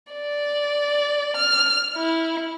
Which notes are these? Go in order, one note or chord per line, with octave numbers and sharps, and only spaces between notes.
D5
F6
E4